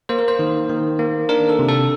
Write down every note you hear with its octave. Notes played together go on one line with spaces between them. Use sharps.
A#3 C5
A#4
C5
D#3
D#3
A#3
D4 A#4
A4
C3
A4